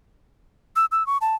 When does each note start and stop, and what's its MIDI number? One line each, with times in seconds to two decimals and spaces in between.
0.76 0.85 88
0.92 1.06 88
1.07 1.18 85
1.21 1.35 81